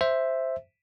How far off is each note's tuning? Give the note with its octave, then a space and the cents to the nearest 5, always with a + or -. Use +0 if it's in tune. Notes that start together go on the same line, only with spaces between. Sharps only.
C5 +0 E5 +0